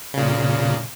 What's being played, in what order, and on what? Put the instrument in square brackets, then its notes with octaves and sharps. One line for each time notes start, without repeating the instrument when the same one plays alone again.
[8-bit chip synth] A#2 C#3